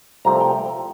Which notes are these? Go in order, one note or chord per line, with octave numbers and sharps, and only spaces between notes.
C2 C3 F3 A3 C4 A#5
G5